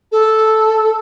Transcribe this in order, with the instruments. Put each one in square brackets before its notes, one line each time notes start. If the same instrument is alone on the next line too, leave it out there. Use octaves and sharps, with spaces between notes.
[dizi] A4